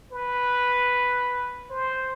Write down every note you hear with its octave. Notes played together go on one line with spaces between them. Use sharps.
B4
C5